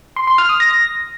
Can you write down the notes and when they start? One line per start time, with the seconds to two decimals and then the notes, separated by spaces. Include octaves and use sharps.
0.16 C6
0.27 C6
0.38 F6
0.49 D#6
0.60 A#6